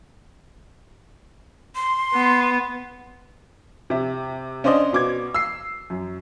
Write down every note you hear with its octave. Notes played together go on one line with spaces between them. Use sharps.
C6
B3
C3 E5
C#4 D4 C5 D5 D#5
B2 D6 G#6
E6 C7
F#2